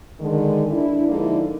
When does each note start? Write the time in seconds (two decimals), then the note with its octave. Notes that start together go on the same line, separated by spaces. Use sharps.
0.21 D3 D#3 G#3
0.72 D4 E4
1.09 D3 F3 G#3 A#3 D#4 E4